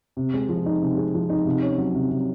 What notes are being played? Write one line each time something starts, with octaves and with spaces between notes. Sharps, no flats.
C3
G#3
F3
D#4
C3
G#3
F3
D#4
C3
C#4
F#3
C3
C3